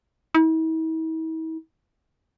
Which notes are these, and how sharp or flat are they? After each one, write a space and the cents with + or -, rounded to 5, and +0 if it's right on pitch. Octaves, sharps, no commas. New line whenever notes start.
E4 -45